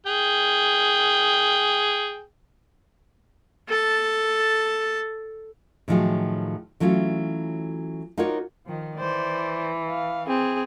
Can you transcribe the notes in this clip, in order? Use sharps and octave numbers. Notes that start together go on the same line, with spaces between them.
G#4 G5
A4 A5
A2 D#3 F3 F#3 F4 G#4
E3 F#3 A3 C#4 F4
D#4 F4 F#4 A#4 C#5 D5
D#3 F3
E3 C5 D5
F5
C4 G#4